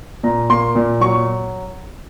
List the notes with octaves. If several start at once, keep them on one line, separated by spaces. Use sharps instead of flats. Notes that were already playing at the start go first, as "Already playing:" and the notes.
A#2 A#5
A#3 C6
A#2
F#3 C#6